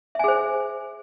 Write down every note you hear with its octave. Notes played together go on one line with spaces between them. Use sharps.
G#4 C5 E5 G#5